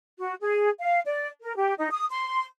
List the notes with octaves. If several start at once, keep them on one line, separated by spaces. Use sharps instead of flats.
F#4
G#4
F5
D5
A#4
G4
D#4
D#6
C6